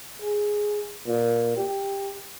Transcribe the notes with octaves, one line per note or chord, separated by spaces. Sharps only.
G#4
A#2
G4